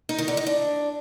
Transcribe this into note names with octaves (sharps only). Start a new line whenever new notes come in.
D#4
D#3
D3
D#4
D4